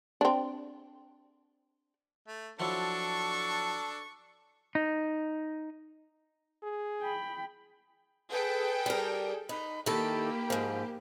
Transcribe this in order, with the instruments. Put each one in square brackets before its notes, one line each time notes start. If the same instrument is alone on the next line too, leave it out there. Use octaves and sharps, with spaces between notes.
[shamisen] C4 D4
[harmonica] A3
[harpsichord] F3 F#3 E4 [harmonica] D4 A4 [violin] C#6
[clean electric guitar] D#4
[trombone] G#4
[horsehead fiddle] G5 B5
[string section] G#4 A4 G5 [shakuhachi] B4
[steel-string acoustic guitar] G3 A#4
[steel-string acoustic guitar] D#4 [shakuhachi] B5
[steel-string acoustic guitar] D#3 E4 A4 [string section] A#3 G4 [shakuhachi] B5
[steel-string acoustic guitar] G#2 F3